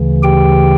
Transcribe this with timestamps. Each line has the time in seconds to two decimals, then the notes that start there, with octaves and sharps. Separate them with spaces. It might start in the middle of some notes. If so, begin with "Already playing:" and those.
Already playing: D2 C#3 E3
0.23 G4 G5